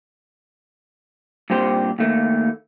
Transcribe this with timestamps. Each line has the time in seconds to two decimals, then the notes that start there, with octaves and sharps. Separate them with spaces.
1.50 G2 A#2 C4 G4 C5
1.99 D#2 A3 A#3